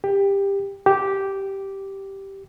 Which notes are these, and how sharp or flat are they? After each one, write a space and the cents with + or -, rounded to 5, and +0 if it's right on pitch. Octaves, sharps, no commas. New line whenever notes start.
G4 +15
G4 -10